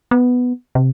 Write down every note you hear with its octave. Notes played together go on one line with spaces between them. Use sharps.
B3
C3